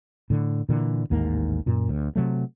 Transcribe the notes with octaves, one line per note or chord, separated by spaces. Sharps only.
A2 D3
A#2 D3 E3
A1 D#2 G#2 A#3
F#2 A#2
D2
C3 F#3 A3